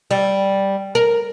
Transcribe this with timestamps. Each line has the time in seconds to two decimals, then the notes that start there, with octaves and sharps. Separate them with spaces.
0.11 G3
0.95 A#4